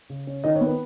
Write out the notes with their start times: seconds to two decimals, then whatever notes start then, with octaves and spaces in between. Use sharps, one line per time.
0.10 C#3
0.27 C#4
0.44 D#3 D#5
0.56 C#5
0.61 B3
0.67 B4